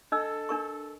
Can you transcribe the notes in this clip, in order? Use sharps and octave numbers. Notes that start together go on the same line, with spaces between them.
D4 A4 D#5 E6
D4 A#4 C#6